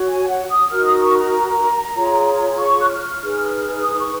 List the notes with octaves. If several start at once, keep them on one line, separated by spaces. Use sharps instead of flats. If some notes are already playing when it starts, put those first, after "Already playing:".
Already playing: F#4 C#5
G#5
F#5
D#6
D#4 F#4 A#4 F6
D#6
C#6
A#5
F4 G#4 C#5
C#6
F#6
F6
D#4 G#4 B4
F6
D#6
C#6